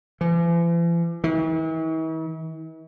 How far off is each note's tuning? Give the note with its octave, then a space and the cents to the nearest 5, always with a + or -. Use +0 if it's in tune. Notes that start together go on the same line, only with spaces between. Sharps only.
E3 +45
E3 -45